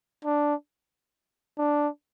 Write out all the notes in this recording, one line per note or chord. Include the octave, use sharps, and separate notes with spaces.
D4
D4